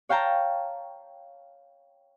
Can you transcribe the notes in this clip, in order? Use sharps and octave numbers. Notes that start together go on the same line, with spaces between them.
C#5 F5 G5 A5 A#5